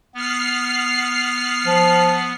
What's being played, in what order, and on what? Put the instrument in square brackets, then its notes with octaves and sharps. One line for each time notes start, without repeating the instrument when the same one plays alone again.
[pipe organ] B3 [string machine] F6 C7
[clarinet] F3